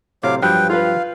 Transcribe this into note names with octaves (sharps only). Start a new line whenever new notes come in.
A2 C3 F#3 F5 D6
G2 F3 F#3 B4 G5
F4 B4 F5